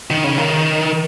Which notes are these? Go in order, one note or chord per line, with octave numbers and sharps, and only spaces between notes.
D#3
C#3
D#3